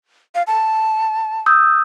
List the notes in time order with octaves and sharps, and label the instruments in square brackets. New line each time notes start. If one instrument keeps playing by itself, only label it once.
[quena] F5
A5
[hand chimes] D#6 E6 G6